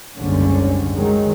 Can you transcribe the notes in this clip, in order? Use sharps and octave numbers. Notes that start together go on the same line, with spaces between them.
F#1 C2 G#2 D3 C#4
D#3 F#3 G#3